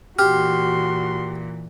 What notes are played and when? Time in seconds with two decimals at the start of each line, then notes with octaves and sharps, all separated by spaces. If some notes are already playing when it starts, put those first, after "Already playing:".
0.19 A#2 E3 F#4 G4 C6 F6